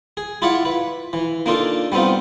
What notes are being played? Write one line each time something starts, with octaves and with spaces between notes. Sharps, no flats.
G#4
E4 F4 D5 E5 F#5
B4
E3
A#3 D4 D#4 F4 A4
G3 B3 C4 D#4 F4